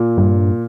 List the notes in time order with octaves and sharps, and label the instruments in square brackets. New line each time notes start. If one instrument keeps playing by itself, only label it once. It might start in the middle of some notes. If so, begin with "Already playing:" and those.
Already playing: [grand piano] A#2
[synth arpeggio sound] G2